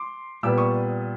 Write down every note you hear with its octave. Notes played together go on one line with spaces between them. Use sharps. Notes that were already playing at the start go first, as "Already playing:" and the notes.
Already playing: C6 D6
A#2 G3 B3 D6 E6
C#6 D#6